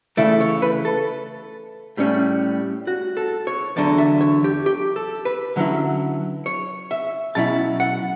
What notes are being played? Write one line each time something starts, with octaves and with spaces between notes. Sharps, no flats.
C#3 E3 A3 E4 D5
C#5
B4
A4
A2 G3 C#4
F#4
A4
C#5
E2 D3 F#3 D5
E5
C#5
G4
G4
A4
B4
D3 F#3 C#4 E4
C#5
E5
B2 F#3 C#4 E4 A5
F#5